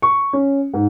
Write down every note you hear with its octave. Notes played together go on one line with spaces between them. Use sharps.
C#6
C#4
G#2